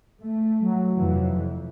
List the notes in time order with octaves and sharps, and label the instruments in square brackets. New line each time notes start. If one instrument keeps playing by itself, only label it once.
[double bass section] A3
[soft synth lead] F#3
[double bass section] F1 F2 E3